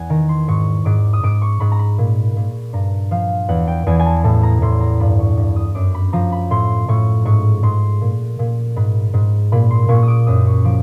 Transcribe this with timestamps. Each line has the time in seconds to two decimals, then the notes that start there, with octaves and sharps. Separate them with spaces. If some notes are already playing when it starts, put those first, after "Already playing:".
Already playing: E2 F#5 G#5
0.10 D#3 A#5
0.29 C6
0.48 G#2 C#6
0.85 G#2 D6
1.13 D#6
1.23 G#2 D6
1.42 C#6
1.60 G#2 B5
1.72 A#5
1.79 B5
1.98 A#2
2.36 A#2
2.73 G2 A#5
3.11 F3 F5
3.48 E2 F#5
3.67 G5
3.86 E2 G#5
4.00 G#5
4.06 A5
4.24 A2 A5
4.43 A#5
4.62 A2 C6
4.81 A#5
5.00 G2 B5
5.19 C#6
5.37 G2
5.56 D#6
5.75 F#2 D6
5.95 B5
6.13 F3 A#5
6.32 B5
6.50 A2 C6
6.88 A2 C#6
7.25 G#2 C#6
7.63 G#2 C6
8.01 A#2
8.39 A#2
8.76 G#2 B5
9.14 G#2
9.52 A#2 B5
9.70 C6
9.89 A#2 C#6
10.02 D#6
10.08 D6
10.27 F#2 D#6
10.46 C#6
10.65 F3 D6